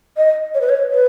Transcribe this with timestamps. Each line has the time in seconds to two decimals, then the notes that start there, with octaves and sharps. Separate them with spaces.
0.17 D#5
0.54 C#5
0.61 B4
0.69 C#5
0.91 B4